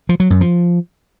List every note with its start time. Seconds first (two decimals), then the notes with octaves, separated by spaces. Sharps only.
0.09 F3
0.20 F#3
0.30 F#2
0.41 F3